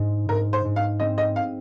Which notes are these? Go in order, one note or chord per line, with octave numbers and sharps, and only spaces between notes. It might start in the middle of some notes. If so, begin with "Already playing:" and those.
Already playing: G#2 D#4
G#2 A#4
C5
G#2
F5
C4 D#5
D#5
F5